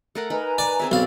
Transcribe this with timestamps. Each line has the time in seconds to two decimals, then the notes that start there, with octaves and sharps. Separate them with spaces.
0.15 A3 A#4 F#5
0.30 D#4 A#4 B4 G#5 A#5 B5
0.58 D5
0.80 C4 G#4 E5
0.92 B1 C4 D5 F5 B5